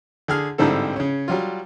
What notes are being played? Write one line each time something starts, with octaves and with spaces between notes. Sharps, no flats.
D3 G#4 F6
A1 G#2 D3 G3 C4 A4
C#3 C#4
F#3 G3 F4